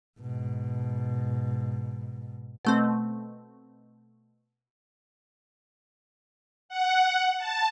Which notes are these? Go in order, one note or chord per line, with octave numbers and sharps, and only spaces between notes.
G#2 B2
B2 A3 C4
F#5
A5